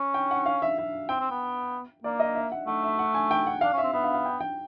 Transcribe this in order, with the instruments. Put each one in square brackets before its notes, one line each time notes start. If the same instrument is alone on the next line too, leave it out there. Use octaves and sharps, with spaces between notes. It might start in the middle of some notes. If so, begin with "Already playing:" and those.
Already playing: [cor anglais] C#4
[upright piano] G5
F#5
F5
E5
E5
[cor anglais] C4 [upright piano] G5
[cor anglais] C4
B3
[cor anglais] A#3 [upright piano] D5
[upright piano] D#5
E5
F#5
[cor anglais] A3 [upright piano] F#5
[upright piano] E5
F#5
G#5
G5
F#5
[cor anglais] D4 [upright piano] F5
[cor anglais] C#4 [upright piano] E5
[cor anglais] C4
[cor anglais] B3 [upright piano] E5
[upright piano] F5
F5
G5
G5